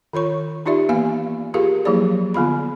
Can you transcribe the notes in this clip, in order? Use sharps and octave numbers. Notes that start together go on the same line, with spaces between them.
D#3 F4 C#5 C#6
D#4 F4 G4 D5 E5
E3 A#3 B3 F5 G#5
F4 G4 G#4 A#4 F5
F3 F#3 A#3 E4 G#4 D5
D3 B3 F4 B5